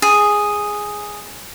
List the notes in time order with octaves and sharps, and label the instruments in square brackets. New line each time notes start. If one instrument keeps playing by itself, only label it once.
[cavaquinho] G#4